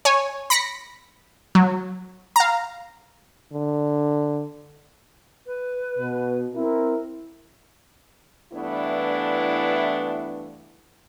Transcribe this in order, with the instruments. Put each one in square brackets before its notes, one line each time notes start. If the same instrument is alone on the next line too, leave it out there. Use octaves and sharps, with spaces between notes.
[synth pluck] C#5 G#5
B5 A#6 B6 C#7
F#3
F5 A#5
[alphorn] D3
[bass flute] B4
[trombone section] B2
[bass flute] C4 [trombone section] E4 A#4
[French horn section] G2 E3 A3 B3 D4 E4